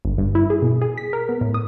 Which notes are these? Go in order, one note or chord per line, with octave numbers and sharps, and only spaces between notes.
G1
G2
E4
G#4
B2
G#4
B6
A#4
B3
A2
D#6